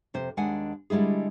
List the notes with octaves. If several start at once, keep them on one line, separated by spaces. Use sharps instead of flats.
F2 C3 C5
D#2 G#3 D4 F#5 G#5
D3 G3 G#3 E4 G#4